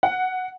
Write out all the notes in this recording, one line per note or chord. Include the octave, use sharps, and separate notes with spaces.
F#5